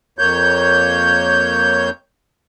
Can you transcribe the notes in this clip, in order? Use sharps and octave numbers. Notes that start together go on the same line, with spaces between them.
F2 A#3 C#5 G6